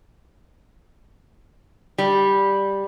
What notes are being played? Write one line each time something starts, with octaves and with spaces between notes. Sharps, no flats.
G3